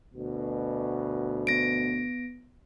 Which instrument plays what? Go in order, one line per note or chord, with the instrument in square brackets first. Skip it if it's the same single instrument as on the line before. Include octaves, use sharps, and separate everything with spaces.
[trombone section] D2 B2
[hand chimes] B3 A#6 D7